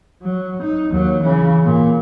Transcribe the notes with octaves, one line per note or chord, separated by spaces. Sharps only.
F#3
D#4
D#2 F#3
C#3 E3
A#2